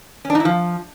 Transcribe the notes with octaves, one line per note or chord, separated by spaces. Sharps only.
C#4
D4
D#4
E4
F3